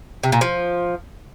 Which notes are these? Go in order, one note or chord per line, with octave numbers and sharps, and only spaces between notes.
C3
A#2
F3